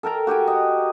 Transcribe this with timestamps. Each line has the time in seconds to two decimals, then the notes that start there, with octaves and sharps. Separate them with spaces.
0.03 A4 A#4 G5 A#5
0.27 F#4 G4 G5 G#5
0.47 D#5